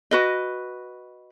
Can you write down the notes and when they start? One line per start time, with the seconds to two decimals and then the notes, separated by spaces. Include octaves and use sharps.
0.11 F#4 B4 D#5